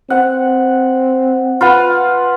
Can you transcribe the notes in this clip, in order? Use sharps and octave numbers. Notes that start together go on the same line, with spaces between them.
C4 F#5
F4 B4 F#5